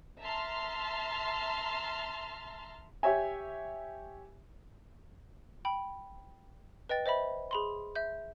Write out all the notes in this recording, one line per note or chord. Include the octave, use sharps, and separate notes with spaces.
E5 A5 A#5 C6 F6
G4 C#5 E5 G#5
G5 B5
B4 D#5 G5 A6
C5 D#5 E5 B5
G#4 B5 C6
E5 G6